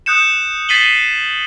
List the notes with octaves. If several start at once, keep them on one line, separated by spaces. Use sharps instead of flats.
D#6 F#6 G6 C#7 E7
A6 B6 C7 D#7 F#7 G7